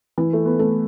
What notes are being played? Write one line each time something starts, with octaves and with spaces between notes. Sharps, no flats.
E3
A3
B3
A3